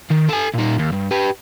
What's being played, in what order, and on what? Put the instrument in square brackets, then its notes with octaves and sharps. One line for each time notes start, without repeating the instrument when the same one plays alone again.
[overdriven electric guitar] D#3
A4 G#5
A#2 D#4
D#2
G2
G4 B4